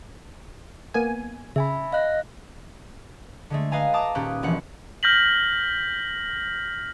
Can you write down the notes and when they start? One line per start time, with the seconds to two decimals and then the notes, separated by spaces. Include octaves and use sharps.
0.94 A#3 B3 G#5
1.56 C#3 E5 G#5 B5
1.92 D#5 F5 F#6
3.50 D3 G#3 A3
3.71 B4 D#5 F5 G#5 A#5
3.94 A5 A#5 D6 D#6
4.15 D#1 A#2 C#4 G4 B4 F#6
4.42 E1 A#1 E3 F#5
5.03 F6 G6 A#6 B6 F#7